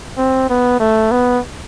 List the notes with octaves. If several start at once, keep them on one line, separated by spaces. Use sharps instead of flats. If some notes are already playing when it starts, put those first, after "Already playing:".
C4
B3
A3
B3